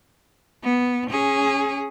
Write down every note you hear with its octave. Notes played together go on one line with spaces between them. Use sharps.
B3
C#4 G#4